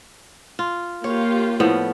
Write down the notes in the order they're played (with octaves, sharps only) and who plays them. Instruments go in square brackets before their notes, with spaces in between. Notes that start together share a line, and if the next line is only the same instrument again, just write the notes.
[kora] F4
[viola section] A#3 F4 G4 [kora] C#5
[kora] A2 F3 B3